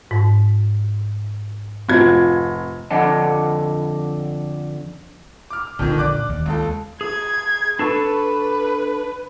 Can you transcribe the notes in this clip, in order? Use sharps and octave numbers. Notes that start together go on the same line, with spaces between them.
G#2
F1 C4 F4 G#6
F2 D3 D4 D#5 F#5 A5
D6 F6
A#1 F2 D3 D#3
D5 D6 F#6
D#2
C#2 A4
G#4 G#6
D4 A4 B4 C#6